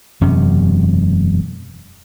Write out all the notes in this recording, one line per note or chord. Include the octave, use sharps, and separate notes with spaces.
E1 F#2 C3 C#4